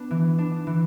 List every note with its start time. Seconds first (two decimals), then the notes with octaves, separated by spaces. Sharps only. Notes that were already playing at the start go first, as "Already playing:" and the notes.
Already playing: B3 D4
0.11 E3
0.38 D4
0.67 E3